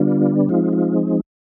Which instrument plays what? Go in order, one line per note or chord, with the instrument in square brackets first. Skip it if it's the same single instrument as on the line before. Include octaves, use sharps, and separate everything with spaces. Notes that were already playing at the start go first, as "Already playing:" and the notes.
Already playing: [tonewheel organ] D3 G3 B3 D4 F4
F3 G#3 C4 D#4 F4
F4